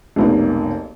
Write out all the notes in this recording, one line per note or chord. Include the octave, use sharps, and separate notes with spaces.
F1 B1 A#3